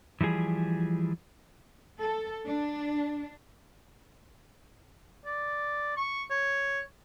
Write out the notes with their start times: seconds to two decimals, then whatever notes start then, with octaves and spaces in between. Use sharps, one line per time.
0.21 E3 F3 G3 G#4
2.00 A4
2.47 D4
5.25 D5
5.97 C#6
6.30 C#5